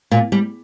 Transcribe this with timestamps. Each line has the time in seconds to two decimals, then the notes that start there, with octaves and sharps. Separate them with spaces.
0.11 A#2
0.32 G3